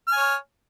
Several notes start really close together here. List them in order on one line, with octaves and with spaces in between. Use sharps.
F6 G#5 C#5